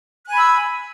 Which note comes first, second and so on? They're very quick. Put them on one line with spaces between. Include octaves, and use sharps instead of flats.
F#6 G#5 B5 E6